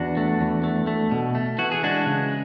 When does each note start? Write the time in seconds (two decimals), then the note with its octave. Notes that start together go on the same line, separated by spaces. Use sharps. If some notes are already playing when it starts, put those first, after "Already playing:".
Already playing: E2 D4 F#4
0.17 A3
0.41 E2
0.64 A3
0.87 A3
1.11 B2
1.35 A3
1.58 E3 F#4
1.72 G#4
1.83 G#3 D4 F#4
2.06 C#3